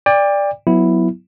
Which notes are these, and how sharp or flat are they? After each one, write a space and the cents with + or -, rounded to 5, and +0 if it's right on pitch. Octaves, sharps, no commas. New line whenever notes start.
D5 +0 G5 +35
F#3 -15 B3 +0 E4 +0